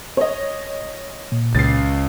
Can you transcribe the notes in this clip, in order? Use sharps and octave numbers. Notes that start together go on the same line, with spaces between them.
C#5 D#5
A#2
C#2 A6 C7